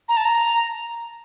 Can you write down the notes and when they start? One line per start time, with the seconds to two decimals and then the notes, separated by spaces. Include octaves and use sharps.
0.09 A#5
0.17 A5
0.25 A#5